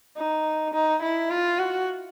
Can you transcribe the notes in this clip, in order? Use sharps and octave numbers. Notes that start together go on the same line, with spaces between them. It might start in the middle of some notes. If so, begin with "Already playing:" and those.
D#4
D#4
E4
F4
F#4